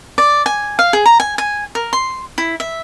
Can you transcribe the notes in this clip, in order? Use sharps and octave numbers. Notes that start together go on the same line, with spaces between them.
D5
G#5
F5
G#4
A#5
G#5
G#5
A#4
C6
E4
E5